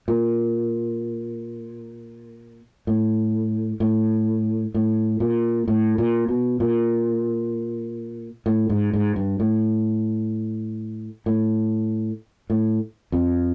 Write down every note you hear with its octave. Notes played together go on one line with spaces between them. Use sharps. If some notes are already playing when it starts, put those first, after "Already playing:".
A#2
A2
A2
A2
A#2
A2
A#2
B2
A#2
A2
G#2
G#2
G2
A2
A2
A2
F2